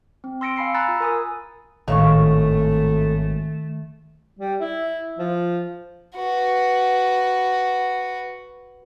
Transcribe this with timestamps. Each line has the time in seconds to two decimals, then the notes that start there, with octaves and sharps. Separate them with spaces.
0.24 C4
0.41 C6 E6 A#6 C#7 D7
0.56 F5 G#5 B5 C7 C#7
0.75 G#5 A#5 B5 E6 F#6 A6
0.88 F4
1.00 A#4 G#5 D#6
1.88 G#1 A2 D#3 A3 F5 C#6
4.39 G3
4.61 E4
5.19 F3
6.16 F#4 B4